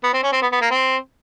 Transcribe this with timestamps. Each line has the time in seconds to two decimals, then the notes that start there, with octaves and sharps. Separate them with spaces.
0.03 B3
0.13 C4
0.23 C#4
0.32 C4
0.42 B3
0.52 B3
0.61 A#3
0.70 C4